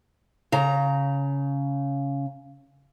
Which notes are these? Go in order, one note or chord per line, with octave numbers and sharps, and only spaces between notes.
C#3 A#5